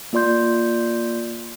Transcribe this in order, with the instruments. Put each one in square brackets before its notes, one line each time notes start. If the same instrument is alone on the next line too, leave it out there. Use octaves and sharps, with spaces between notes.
[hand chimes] A#3 F4 D5 C6 G6